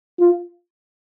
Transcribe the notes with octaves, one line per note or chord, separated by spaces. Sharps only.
F4